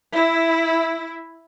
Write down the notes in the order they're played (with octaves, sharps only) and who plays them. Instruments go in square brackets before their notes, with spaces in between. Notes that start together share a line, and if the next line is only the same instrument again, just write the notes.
[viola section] E4